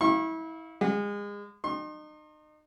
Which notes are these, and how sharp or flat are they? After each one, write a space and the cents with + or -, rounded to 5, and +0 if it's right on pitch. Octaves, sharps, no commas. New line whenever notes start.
E4 -30 F5 +0 C#6 -35
G#3 -30 F#5 +0
D#4 -35 C6 +35